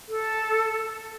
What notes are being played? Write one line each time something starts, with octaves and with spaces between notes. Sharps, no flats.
A4